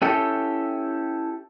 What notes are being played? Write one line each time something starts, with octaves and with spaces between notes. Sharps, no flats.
C#4 E4 G4 A4 G5